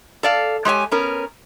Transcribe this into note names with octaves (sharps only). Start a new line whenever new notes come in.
A4 D5 F5
G#3 G4 C#5 G#5
B3 C#4 A#4